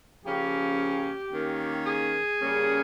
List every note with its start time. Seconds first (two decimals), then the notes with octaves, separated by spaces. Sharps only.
0.24 C#3 F3 A#3 C#4 G4
1.32 D#3 A#3 C#4
1.86 G#4
2.40 C#3 G3 A#3 C#4